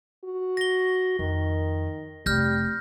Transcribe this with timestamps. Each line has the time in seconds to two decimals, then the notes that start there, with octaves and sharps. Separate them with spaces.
0.24 F#4
0.57 A#6 G7
1.19 F2 D#3
2.26 F1 G3 F6 G6 A#6